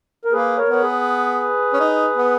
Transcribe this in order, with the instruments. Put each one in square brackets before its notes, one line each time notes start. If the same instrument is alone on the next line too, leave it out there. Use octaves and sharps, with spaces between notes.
[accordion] A#4
[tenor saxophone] A#3 [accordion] G#4 B4
[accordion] A#4 C#5
[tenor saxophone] B3 [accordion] C#5
[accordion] G#4 B4
[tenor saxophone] C#4
D#4
B3